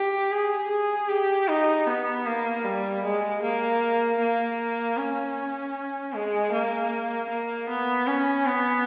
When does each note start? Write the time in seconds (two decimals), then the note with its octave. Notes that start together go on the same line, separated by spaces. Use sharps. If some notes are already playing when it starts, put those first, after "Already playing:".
Already playing: G4
0.32 G#4
0.71 G#4
1.09 G4
1.48 D#4
1.87 B3
2.26 A#3
2.65 G3
3.04 G#3
3.42 A#3
4.20 A#3
4.98 C#4
6.14 G#3
6.52 A#3
7.30 A#3
7.69 B3
8.07 C#4
8.47 B3